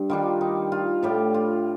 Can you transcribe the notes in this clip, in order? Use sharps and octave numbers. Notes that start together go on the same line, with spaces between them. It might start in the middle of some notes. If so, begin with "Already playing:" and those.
Already playing: G2
D#3 G3 D4 F4
D#4
F4
A2 G3 D4 G4
F4